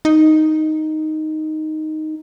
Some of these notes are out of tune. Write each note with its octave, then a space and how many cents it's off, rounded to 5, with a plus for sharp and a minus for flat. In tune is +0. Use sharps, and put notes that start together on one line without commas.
D#4 +0